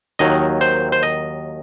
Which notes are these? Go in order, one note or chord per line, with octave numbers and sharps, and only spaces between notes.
D#2 D#3 F#3 D#5
C5
C5
D#5